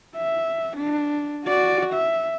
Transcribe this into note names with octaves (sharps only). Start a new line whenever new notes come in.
E5
D4
F#4 D5
E5